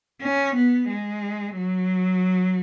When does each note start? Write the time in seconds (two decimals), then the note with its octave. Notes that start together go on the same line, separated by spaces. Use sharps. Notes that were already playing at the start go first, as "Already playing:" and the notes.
0.23 C#4
0.56 B3
0.90 G#3
1.56 F#3